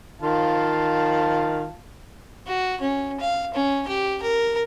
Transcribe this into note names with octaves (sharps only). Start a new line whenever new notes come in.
D#3 F4 F5 A5
F#4
C#4
F5
C#4
G4
A#4